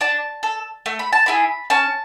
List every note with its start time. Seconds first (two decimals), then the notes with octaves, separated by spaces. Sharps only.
0.01 D4 A5
0.43 A4
0.86 A3
0.99 B5
1.13 A5
1.26 E4 G#4 B5
1.70 C#4 A5